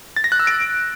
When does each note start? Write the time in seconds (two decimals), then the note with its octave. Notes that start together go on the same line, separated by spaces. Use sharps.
0.16 A6
0.24 A#6
0.32 F#6
0.40 E6
0.47 D7